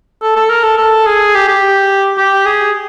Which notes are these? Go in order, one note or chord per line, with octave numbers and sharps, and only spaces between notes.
A4
A4
A#4
A4
A4
G#4
G4
G4
G4
G#4